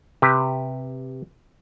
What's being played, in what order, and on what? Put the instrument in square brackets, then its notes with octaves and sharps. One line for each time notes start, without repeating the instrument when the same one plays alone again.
[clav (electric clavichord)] C3 G4 B4